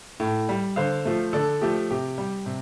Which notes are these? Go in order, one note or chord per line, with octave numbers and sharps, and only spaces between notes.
A2
G3
D3 C5 F5
F3 A3
D3 A4 D5
F3 A3 G4
C3 G4
G3
C3